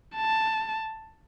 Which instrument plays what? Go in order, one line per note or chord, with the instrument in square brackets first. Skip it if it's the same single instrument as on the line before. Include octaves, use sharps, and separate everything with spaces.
[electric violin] A5